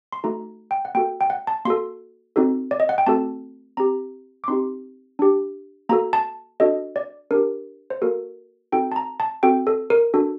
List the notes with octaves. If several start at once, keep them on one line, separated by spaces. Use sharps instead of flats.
C6
A3 D#4 F#4 A4 A#5
G5
F#5
A#3 F#4 A4 G5
G5
F#5
A5
A#3 F#4 A4 C6
C4 D#4 F#4 A4
D5
D#5
F#5
G5
A3 C4 F#4 A4 A5
C4 G4 A#5
D6
C4 D#4 G4 C6
D4 G4
A#3 F#4 A4 A#5
A5
D4 F#4 A4 D#5
D5
D4 G4 A#4
C5
A#3 F#4 A4 A#4
C4 D#4 F#4 A4 G5
A5
A#5
A5
C4 F#4 A4 G5
A4
A#4
D4 F#4 A4